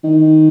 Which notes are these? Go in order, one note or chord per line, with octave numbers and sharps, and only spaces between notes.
D#3